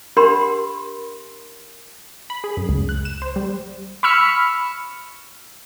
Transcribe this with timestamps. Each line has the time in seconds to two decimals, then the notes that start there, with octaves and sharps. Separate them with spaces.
0.17 D4 G4 A#4 F#5 B5 C6
2.30 B5
2.44 G#4
2.57 F#2
2.69 C#2
2.89 F#6
3.05 E7
3.22 C5
3.36 G3
4.03 B5 C#6 E6 F6 C#7